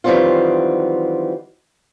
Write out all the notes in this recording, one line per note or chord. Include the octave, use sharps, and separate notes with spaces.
D#3 E3 F#3 G3 C4 F4